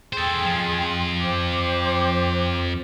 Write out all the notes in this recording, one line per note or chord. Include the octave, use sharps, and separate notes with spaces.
G#4 A4 C5 G5 C6
F2 F3
C5 G5 D6